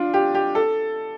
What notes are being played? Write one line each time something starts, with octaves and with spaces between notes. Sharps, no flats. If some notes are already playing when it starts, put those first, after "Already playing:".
Already playing: D4 F4
G4
G4
A4